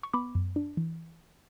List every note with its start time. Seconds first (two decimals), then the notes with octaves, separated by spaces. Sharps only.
0.03 C#6
0.13 B3 B5 D6
0.35 F#2
0.56 D4
0.77 E3